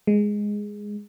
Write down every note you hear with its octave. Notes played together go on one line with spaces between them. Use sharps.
G#3